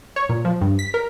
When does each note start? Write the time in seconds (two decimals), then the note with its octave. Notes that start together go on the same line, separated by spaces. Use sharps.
0.16 C#5
0.29 A#2
0.45 F3
0.61 G2
0.79 B6
0.94 A#4